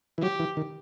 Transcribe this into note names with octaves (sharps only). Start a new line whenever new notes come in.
E3
F#3 G4
E3
D#3